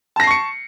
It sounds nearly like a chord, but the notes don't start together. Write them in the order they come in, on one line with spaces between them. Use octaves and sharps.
A5 A#6 C7 C#6 C#7